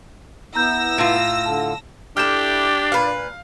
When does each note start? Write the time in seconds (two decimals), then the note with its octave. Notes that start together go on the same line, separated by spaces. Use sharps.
0.55 B3 E4 A#5 E6 G6 A#6
0.98 A2 F4
1.46 D3 A5
2.17 D4 E4 G4 A4 F6 G6 E7
2.92 A#2 B4 F5